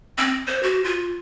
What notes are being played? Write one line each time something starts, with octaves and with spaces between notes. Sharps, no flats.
C4
C5
F#4
F4